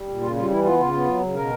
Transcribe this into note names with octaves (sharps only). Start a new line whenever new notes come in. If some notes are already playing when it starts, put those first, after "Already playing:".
Already playing: G3
A#2
C#3 F4
G3 F4
E3 E4
B3 F4
C#3 F4
B3
F#3
C#3
B2 A#4